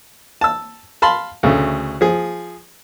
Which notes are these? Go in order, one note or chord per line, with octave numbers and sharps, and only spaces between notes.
A5 E6
F5 A5 B5 C6
D2 C#3 A3
F3 G#4